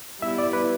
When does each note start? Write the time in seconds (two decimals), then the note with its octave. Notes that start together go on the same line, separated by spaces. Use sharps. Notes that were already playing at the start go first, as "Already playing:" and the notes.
0.22 G3 B3 E4 E5
0.38 D5
0.53 B4